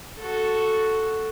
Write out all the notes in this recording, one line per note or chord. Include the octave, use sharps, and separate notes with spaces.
F#4 A4